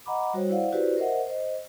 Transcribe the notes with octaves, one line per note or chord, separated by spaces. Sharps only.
D#5 F#5 A#5 B5 D6
G3 F#4 C5 C#5
E4 C5 D5 F5 F#5
E4 F#4 G4 B4 C5 D5
A#4 C5 D#5 E5 F#5
C5 D#5